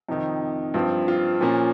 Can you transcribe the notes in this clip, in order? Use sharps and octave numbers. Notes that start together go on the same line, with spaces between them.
F2 C3 D#3 D#4
G2 F3 C4
F4
A#2 F3 A#3 C#4